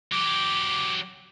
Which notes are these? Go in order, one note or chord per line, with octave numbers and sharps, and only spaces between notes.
F#3 G4 D6